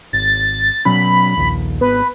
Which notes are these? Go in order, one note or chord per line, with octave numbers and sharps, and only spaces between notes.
G#1 A6
B2 F#3 C#4 B5
A#1 D#2
G#1 B3 B4